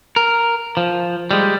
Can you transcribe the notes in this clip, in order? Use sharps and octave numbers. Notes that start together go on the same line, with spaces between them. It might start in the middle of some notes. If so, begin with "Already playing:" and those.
A#4
F3
G3 G#3